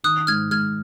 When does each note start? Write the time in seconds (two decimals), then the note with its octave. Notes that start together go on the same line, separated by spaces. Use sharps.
0.04 D#3 D#6 F#6
0.27 G#2 F6 G#6
0.51 G#3 F6 G#6